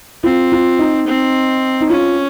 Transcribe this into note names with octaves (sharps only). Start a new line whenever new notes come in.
C4 F4
F4
D#4
C4
D#4
C#4 F4